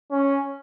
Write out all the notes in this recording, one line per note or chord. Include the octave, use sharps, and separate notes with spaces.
C#4